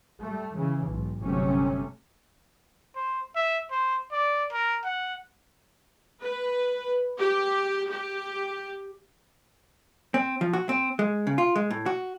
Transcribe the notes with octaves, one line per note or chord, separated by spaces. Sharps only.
G3 A3
C#3 E3
B1 G#2
G1 C3 F#3 A3 C#4
C5
E5
C5
D5
A#4
F#5
B4
G4
G4
C4
F3
F#4
C4
G#3
C#3
F4
G#3
A2
F#4